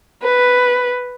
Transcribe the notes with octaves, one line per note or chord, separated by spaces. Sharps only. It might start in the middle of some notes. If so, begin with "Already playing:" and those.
B4